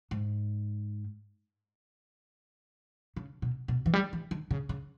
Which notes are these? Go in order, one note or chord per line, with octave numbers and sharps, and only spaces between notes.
G#2
C#3
B2
B2
E3
G3
E3
D#3
C#3
C#3